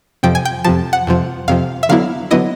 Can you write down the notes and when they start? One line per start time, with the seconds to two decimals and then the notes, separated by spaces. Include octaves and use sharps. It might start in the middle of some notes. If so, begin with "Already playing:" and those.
0.23 F2 C3 F3 G5
0.35 G#5
0.45 G5
0.64 F2 C3 F3 A5
0.93 F#5
1.07 F2 C3 F3
1.48 F2 C3 F3 F5
1.83 E5
1.89 D3 F#3 B3 E4 F5
2.31 D3 F#3 B3 E4 D#5